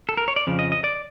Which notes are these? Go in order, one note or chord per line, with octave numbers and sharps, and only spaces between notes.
A4
A#4
C#5
D5
F2 C#3 F3
D#5
D#5
D5